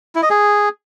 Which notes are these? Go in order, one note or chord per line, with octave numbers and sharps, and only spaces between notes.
E4
D#5
G#4